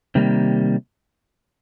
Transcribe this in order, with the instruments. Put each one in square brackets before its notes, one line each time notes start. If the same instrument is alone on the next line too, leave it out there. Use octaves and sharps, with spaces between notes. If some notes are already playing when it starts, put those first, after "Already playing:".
[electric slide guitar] C3 D#3 G3 A#3